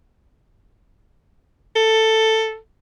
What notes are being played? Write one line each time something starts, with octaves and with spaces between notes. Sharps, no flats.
A4